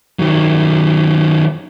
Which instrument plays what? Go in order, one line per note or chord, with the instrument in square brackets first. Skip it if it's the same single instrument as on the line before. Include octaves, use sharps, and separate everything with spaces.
[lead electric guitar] D#3 F#3